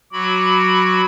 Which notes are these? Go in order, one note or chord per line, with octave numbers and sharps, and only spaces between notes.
F#3 F#4 B5 D6